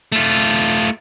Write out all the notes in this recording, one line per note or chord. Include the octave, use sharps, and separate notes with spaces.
A3 F4